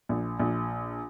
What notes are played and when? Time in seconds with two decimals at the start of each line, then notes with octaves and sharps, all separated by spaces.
0.09 A#1
0.39 A#1